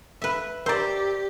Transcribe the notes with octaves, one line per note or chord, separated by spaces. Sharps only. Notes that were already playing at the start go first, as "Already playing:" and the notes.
B4 E5
G4 A#4 C5 D5 A#5